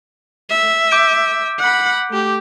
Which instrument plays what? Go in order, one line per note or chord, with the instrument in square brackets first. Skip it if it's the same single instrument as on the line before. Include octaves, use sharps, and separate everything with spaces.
[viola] E5
[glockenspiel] D6 G6 D7
[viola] F#5 B5
A3 G4